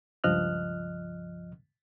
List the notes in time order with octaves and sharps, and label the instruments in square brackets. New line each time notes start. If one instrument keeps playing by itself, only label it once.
[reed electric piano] C#2 G2 F3 D#5 F6 F#6